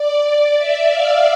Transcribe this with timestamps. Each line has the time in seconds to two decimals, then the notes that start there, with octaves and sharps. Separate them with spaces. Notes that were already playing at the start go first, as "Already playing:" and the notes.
Already playing: D5
0.58 E5
0.90 F5